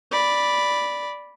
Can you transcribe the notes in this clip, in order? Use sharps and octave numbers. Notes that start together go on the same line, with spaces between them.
D5 B5